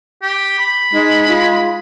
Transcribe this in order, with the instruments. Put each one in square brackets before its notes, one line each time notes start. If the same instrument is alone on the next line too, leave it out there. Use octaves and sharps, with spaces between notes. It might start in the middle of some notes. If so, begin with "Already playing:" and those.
[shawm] G4
B5
[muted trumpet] G#3 [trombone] D#4
[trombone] F4